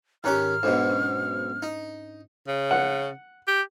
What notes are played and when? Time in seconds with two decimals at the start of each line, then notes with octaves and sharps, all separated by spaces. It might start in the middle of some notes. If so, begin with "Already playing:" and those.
0.24 G#2 D#3 C#4 G4 A#5 F6 F#6
0.63 B1 G#2 B2 D4 C5 D#5
0.90 C#4
1.62 D#4
2.48 C#3
2.71 F#5
3.48 G4